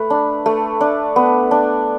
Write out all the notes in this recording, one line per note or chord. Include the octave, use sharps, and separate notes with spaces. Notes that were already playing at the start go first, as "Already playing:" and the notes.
Already playing: A3 B4
D4
A3
D4
B3
D4